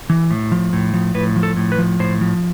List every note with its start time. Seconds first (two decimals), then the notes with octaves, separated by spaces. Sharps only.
0.10 E3
0.31 A2
0.52 F3
0.73 A2
0.94 F3
1.14 A2 B4
1.36 F3
1.43 A4
1.57 A2
1.72 B4
1.78 F3
1.99 A2 C5
2.21 F3